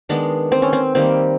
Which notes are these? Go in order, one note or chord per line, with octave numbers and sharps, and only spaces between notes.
D#3 G#3 B3 D4
C4
C#4
C4
D#3 G3 A#3 C4